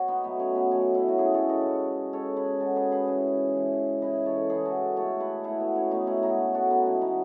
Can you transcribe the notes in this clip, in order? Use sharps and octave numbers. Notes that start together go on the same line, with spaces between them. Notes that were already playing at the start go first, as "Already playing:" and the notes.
Already playing: B2 F#4 C#5
B3 D#4
B2 F#3 A3 B3
C#4
B3
B2 F#3 A3 C#4
C#4 E4
F#4
C#3 G#3 E4 G#4
A4 C#5
B4 D#5
C#3 G#3
C#3 G#3 A4 C#5
G#4 B4
C#3 G#3 F#4 A4
G#4 B4
G#4 B4
C#3 E3 G#3
C#3 E3 G#3
C#3 E3 G#3 B4 D#5
A4 C#5
C#3 E3 G#3 G#4 B4
F#4 A4
B2 A3 A4 C#5
G#4 B4
B2 A3 E4 G#4
B3
C#4
B2 A3 B3 D#4
C#4 E4
G#4
D#4 F#4
B2 A3
F#4 A4
B3 D#4
C#3 E3 G#3
B3 D#4